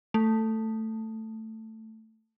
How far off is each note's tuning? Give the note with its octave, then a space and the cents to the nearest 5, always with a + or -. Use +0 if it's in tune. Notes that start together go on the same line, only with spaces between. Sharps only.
A3 +10